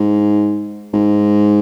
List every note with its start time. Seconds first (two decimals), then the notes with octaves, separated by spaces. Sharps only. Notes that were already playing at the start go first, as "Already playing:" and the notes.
Already playing: G#2
0.93 G#2